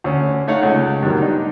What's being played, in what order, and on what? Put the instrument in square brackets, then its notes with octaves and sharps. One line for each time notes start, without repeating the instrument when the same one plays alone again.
[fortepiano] D2 C#4
A3 D#4 C#5 F5 F#5
C#2
G2 B2 D#3 F#3
D4 D#4